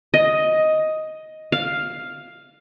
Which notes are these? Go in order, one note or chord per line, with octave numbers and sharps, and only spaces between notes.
D#5
F5